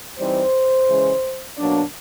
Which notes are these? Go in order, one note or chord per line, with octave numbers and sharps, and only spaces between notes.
E3 G3 C4 D#4 C5
C#3 E3 G#3 C#4
B2 F#3 A#3 D4